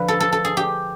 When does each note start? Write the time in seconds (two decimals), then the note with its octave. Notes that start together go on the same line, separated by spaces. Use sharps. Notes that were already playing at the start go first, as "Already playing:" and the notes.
Already playing: F2 D3 F3 B4
0.08 A4
0.20 A4
0.32 A4
0.45 G#4
0.57 G4